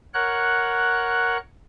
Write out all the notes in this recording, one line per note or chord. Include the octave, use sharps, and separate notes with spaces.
A#4 C#5 F#5 F#6